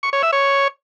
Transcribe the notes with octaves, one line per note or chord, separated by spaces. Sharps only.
C#6
C#5
E5
C#5